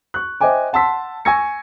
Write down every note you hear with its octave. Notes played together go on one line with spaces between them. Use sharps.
C#6 F#6
C5 D#5 E5 G5 G#5 D6
F#5 A5 C6 E6 B6
G#5 C#6 E6 G#6 A#6 C#7